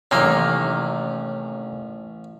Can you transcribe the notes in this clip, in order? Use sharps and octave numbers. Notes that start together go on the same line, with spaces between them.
A1 C3 D#3 A#3 C#4